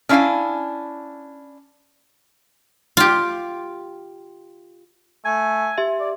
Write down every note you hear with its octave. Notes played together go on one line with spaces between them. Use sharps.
C#4 D4 E4 E5 F5 G#5
F4 G4
A3 G#5
G4 E5
D5